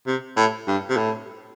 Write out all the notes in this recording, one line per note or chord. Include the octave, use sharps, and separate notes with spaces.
C3
A2
G2
C3
A2